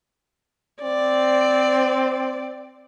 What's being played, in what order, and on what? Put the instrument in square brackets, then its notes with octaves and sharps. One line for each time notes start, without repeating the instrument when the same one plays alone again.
[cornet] C4 [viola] D5